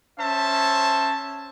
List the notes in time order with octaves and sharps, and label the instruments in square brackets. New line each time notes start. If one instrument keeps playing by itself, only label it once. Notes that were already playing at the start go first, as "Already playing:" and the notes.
[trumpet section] C#4 C5 E5 A5